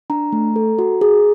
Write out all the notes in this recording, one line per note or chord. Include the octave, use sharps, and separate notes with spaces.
D4 A#5
A3
A4
F#4
G#4